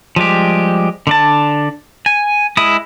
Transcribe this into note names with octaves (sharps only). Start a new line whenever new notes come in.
F3 G3 G#3 G4
D3 D4 A5
G#5
G#3 E4 D#6